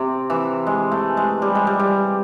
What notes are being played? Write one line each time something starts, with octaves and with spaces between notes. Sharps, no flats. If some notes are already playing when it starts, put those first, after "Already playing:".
Already playing: C3
E3
G#3
A3
G#3
G3
G#3
G3
G3